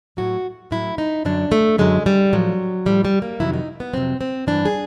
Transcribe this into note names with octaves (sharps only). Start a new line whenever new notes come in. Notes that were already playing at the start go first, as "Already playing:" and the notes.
A2 F#3 F#4
A2 F#3 E4
D#4
F#2 D3 F#3 D4
A3
F#2 D3 F#3 G#3
G3
A2 F3 F#3
A2 F3 G3
G3
A#3
F2 C3 D#3 F#3 E4
D#4
B3
F2 C3 D#3 F#3 C4
C4
G2 E3 D4
G#4